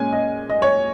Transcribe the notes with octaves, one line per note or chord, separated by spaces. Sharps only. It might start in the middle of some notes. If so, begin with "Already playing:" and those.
Already playing: A#2 G#3 C#4 G#5
D#5
D#5
C#5